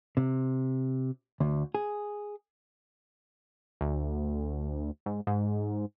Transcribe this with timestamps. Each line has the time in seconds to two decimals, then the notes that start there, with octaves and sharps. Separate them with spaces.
0.17 C3
1.40 D2
1.75 G#4
3.81 D2
5.06 G#2
5.27 G#2